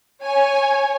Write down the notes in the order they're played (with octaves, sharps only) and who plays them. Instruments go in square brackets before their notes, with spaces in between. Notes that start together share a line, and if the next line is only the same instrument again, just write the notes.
[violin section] C#5 G#5